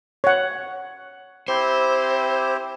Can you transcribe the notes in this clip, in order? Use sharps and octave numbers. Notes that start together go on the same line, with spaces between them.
C#5 F#5
C4 E4 G4 C5